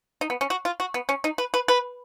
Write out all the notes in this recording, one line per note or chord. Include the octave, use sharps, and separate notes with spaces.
D#4
B3
C#4
F#4
F4
F#4
B3
C#4
D#4
B4
B4
B4